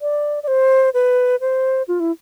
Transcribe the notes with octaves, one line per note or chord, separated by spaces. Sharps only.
D5
D5
C5
B4
C5
F4
E4